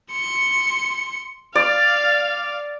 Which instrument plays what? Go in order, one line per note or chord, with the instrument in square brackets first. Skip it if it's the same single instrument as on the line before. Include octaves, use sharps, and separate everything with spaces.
[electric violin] C6 C#7
[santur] D5 [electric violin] F5